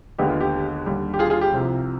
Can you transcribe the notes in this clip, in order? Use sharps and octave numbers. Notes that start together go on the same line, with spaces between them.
D#2 D3 G#3 B3 G4
F4
G4
D#2 D3 G3
G4
F4 G#4
F4 G#4
G4
C2 C3 F3